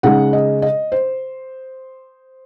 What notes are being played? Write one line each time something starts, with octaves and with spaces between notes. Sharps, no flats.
C#3 G#3 D#4 F#5
D#5
D#5
C5